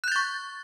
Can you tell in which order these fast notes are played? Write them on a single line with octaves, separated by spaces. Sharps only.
F#6 G6 A6 C#6